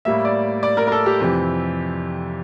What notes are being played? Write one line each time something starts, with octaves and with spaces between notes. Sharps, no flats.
A2 G3 A#3 E5
D5
D5
A#4
A#4
A4
G4
F2 C3 E3